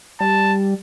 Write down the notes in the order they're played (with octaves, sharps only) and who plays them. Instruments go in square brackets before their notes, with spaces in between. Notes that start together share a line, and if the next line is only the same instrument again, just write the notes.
[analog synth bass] G3 [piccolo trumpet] A5